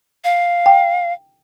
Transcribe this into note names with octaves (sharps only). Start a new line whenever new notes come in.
F5
G5